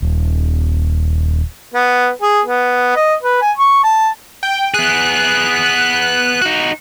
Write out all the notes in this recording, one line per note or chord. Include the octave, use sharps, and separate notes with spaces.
D#1
B3
G#4
B3
D#5
B4
G#5
C#6
A5
G5
B3 G#4 F#6
D#4 F#4